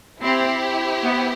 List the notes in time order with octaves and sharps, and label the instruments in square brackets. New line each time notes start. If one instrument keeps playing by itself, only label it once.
[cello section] C4 [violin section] E4 G4 C5
[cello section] B3